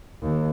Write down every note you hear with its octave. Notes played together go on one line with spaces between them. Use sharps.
D#2